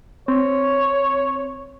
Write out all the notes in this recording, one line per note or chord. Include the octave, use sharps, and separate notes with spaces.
C4 C#5